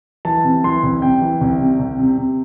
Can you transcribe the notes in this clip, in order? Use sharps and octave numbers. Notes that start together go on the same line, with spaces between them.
E3 A5
C3
E3 C6
C2
C3 G5
E3
C2
C3
C2
C3
C3